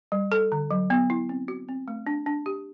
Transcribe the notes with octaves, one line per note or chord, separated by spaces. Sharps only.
G3
A4
D3
F#3
B3
E4
C4
F#4
C4
A3
D4
D4
G4